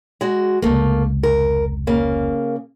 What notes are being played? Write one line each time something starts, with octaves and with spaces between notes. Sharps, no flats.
G#3 F#4
F1 C#2 A3 A#3
A#4
C#3 A#3